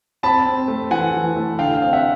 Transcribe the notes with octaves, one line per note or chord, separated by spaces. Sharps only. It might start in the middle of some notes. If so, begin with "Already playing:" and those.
C4 A5 B5
C4
A3
E3 F#5 G#5
E3
A3
D3 F5 G5
C4 F5
E5 F#5